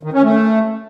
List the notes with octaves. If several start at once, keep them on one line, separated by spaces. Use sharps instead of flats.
D#3
C#4
A3